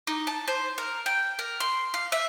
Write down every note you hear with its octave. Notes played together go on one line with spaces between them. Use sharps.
D#4
A5
C5
A#4
G5
A#4
C6
F5
E5